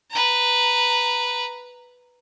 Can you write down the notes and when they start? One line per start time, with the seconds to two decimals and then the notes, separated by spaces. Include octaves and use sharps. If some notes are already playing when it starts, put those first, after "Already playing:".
0.11 B4 A#5